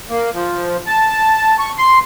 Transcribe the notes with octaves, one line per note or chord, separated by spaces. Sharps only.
A#3
F3
A5
C#6
C6